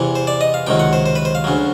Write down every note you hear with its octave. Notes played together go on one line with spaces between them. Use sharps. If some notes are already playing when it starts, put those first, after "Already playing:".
Already playing: E2 C3 E3
C5
D5
D#5
F5
C#2 C3 D#3 F#3 G5
F#5
C5
C5
B4
C5
F5
D2 C#3 F#3